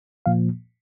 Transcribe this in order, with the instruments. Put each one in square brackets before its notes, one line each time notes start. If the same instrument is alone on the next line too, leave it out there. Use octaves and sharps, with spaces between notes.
[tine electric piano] A#2 F3 A#3 F5